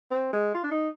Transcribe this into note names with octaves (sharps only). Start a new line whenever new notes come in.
C4
G#3
F4
D4
D#4